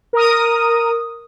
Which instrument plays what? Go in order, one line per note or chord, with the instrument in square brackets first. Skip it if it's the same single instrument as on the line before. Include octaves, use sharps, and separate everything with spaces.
[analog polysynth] A#4 D#6